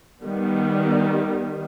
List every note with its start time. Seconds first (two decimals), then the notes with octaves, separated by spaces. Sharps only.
0.23 D#3 G3 B3